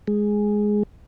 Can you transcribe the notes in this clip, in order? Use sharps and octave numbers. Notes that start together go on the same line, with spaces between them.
G#3